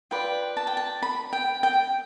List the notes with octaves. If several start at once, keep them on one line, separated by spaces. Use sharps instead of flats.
F4 B4 D5 G5
A5
G5
A5
B5
G5
G5